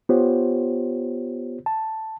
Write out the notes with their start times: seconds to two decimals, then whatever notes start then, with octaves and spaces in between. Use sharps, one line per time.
0.09 B3 F4 G4 C5 C#5
1.66 A5